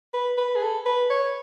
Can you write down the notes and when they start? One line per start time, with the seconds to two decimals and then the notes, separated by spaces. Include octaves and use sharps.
0.14 B4
0.38 B4
0.56 G#4
0.63 A4
0.86 B4
1.10 C#5